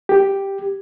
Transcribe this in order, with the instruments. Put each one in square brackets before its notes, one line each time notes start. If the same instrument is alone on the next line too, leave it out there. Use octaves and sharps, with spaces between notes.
[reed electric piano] G4